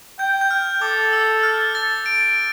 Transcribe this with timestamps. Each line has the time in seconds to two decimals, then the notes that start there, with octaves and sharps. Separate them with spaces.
0.19 G5 G6
0.41 G6
0.51 F6
0.82 A4 D6
1.13 E6
1.43 F6
1.75 A6
2.06 D7